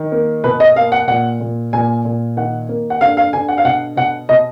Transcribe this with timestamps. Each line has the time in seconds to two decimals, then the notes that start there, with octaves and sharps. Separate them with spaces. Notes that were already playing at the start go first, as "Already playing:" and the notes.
Already playing: D#3
0.12 A#3
0.44 B2 B4
0.60 D#5
0.76 A#3 F5
0.92 F#5
1.08 A#2 F#5
1.40 A#2
1.73 A#2 G#5
2.05 A#2
2.37 D#3 F#5
2.69 A#3
2.90 F#5
3.01 D3 F5
3.17 F5
3.33 D3 G#5
3.48 F#5
3.58 F5
3.65 B2 F#5
3.97 B2 F#5
4.29 B2 D#5